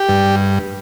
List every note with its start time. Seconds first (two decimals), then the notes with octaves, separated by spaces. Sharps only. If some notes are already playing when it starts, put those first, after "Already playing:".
Already playing: G4
0.09 G2